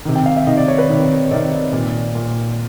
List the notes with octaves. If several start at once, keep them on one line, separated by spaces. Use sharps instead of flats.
C3 D#3
G5
F5
E5
C3 D#3 D#5
D5
C#5
B4
C3 D#3
C3 D#3 D5
A#2 D5
A#2